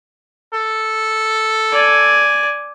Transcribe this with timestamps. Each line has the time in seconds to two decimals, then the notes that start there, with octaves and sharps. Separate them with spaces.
0.53 A4
1.72 D5 G#5